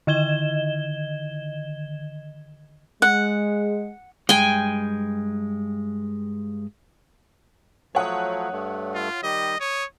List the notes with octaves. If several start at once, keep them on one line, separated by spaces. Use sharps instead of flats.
D3 D#3 D#5 G#6 E7 G7
G#3 F#5
G2 G#3 G5 G#5
F3 F#3 A3 C#5 F#5 D#6
G2 A3
F4
D#3 G3 G4 D#5
C#5 D#6